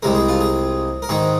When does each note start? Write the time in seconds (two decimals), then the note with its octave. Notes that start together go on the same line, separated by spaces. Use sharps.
0.03 C2 C3 G#3 A#4
0.15 G#4
0.28 F4
0.41 G#4
1.02 A#4
1.09 G#2 D#3 G#3 G#4